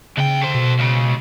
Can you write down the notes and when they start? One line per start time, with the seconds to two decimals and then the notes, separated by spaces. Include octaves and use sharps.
0.17 D#2 C#3 G5
0.42 A4 C5
0.54 B2
0.79 C#2 C#3